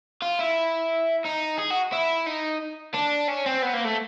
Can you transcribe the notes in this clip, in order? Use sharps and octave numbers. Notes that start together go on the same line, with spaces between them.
F4
E4
D#4
G#4
F#4
E4
D#4
D4
C#4
C4
B3
A#3
A3